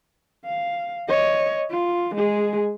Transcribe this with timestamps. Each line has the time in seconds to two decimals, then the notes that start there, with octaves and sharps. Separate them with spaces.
0.45 F5
1.09 C#5 D#5
1.71 F4
2.15 G#3 G#4